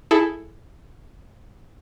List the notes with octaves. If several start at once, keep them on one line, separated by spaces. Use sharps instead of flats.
E4 G#4 A4